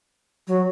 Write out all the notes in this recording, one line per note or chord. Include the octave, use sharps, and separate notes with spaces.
F#3